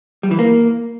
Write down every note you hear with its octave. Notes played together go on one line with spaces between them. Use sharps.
G3
E3
A#3